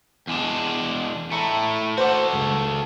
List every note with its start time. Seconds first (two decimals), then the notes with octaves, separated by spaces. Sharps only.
0.27 E2 G#3 D4
1.32 A3 E4 A5 A#5 C#7
1.98 F#4 A4 C5 F#5 D6
2.33 C#2